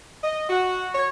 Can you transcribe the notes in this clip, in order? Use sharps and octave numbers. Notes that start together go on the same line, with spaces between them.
D#5
F#4
C#5